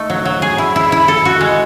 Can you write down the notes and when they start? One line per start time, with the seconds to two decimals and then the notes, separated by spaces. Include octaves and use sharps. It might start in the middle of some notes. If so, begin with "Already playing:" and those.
Already playing: A3 D#4
0.10 F#3
0.25 F#3
0.42 G#4
0.58 E4
0.76 E4
0.92 E4
1.08 A4
1.25 F#4
1.41 G#3